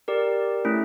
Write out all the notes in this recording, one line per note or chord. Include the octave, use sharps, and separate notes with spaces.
G4 A#4 D5
A3 C#4 E4